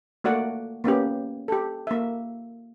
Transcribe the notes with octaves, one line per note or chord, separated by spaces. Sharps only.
A3 A#3 F#4 D5 F#5
A#3 B3 C#4 G4
G4 A4
A#3 E5